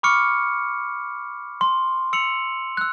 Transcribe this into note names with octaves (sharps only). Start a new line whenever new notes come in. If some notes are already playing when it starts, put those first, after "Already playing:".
B5 C#6 D6 F6 C#7
C6
E6 C#7 F7 F#7
E6 F#6